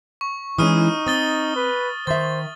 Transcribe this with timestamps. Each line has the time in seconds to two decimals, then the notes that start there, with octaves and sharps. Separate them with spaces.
0.21 C#6
0.58 E3 G#3 C#4 D#4 D#6 F6 D#7
1.07 C4 D#6 A6 G7
1.56 B4
2.07 D#3 C5 E5 A6